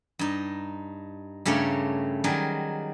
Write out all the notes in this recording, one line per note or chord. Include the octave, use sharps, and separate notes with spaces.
G2 D#4
G2 C#3 A3 G4 A#4 C#5
D#3 F#3 G3 G#4 A#4